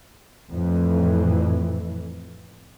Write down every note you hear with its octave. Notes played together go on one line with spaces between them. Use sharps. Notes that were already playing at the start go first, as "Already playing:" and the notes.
F2 A2 E3